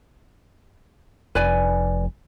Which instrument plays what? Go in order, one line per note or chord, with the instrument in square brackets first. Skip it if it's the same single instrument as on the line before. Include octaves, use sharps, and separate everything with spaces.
[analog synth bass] F1 [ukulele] B4 D5 G#5